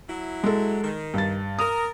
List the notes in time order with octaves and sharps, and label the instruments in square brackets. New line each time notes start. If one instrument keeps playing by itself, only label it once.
[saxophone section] F#3 E4
[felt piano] G#3 A4
[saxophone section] D#3
[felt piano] G2 A6
[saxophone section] A#4 [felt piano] D#6